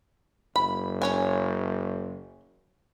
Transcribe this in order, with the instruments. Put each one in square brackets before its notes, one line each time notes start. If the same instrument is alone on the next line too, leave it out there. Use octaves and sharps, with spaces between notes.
[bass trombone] F#1 [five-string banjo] B5
[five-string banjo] C#4 C#5 G#5